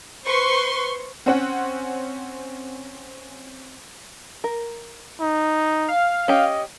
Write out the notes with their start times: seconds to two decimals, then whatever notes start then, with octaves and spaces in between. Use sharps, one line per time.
0.25 B4 C5 C6 C#6
1.26 C4 C#4 F#5
4.44 A#4
5.20 D#4
5.88 F5
6.28 C#4 G4 D#5